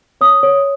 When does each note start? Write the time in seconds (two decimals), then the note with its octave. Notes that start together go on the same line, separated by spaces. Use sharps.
0.21 C#5 D#6
0.43 C#5